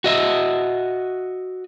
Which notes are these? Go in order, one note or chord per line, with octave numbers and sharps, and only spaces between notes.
F#4 D#5 E5